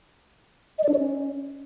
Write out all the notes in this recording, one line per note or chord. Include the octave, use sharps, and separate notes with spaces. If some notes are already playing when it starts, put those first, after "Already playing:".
D#5
D5
D4
C#5
C#4